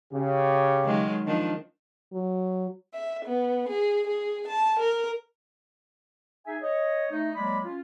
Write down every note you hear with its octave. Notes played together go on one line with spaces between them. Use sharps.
C#3 G4
D#3 F#3 G#3
D#3 F3 D4
F#3
E5
B3
G#4
G#4
A5
A#4
D#4 G#4 E5 G#5
C#5 D#5
A3 D#4
F#3 G#3 A#3 D5 B5
C#4 F4